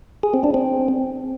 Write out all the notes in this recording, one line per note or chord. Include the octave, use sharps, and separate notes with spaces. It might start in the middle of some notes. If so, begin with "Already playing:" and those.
G#4
C4
D4
C4